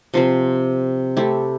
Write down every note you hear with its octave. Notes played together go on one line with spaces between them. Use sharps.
C3 F3 C4
A3 C4 E4 G4